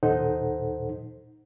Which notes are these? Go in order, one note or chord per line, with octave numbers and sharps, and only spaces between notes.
D#2 A#2 D#4 A4 C5 F#5